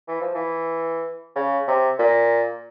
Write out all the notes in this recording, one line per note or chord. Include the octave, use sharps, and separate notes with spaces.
E3
F3
E3
C#3
C3
A#2